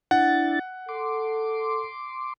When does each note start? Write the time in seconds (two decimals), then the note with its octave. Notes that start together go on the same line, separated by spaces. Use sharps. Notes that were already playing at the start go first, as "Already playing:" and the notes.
0.11 D4 E4 F#5 A6
0.89 A4 C6 D6